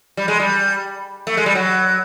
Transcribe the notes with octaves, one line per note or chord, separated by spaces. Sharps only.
G3
G#3
G3
A3
G#3
G3
F#3